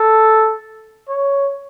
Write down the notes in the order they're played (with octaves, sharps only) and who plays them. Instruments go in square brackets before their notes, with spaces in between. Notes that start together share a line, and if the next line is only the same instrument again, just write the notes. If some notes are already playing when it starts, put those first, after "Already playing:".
Already playing: [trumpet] A4
C#5